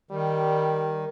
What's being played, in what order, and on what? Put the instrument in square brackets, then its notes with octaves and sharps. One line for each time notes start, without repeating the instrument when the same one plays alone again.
[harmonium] D#3 [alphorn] G3